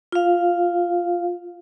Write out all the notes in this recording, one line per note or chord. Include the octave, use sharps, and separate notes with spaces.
F4 F5